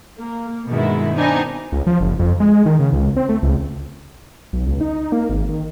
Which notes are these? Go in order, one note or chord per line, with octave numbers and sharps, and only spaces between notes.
A#3
G2 B2 D#3 G#3 B3 E4
B3 C4 D4 D#4 G#5
C#2
F3
F#1
F2
G#3
D#3
C#3
C#2
C4
A3
C#2
B1
C#2
D#4
A#3
G#1
D#3